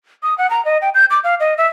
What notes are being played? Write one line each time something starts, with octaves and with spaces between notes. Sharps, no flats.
D#6
F#5
A#5
D#5
G5
G6
D6
F5
D#5
E5